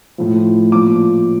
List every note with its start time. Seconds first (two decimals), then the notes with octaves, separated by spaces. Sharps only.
0.18 A2 F3
0.72 A#2 F3 D6